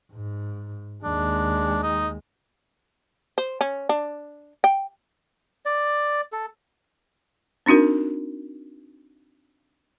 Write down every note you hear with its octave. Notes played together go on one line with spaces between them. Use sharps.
G#2
D#2 G#3 D4
D#4
C5
C#4
D4
G5
D5
A4
C4 D4 D#4 F#4 A#4